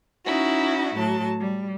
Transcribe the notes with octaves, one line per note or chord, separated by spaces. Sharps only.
C#4 D#4 E4 F#4
A2 F#3 A5
G3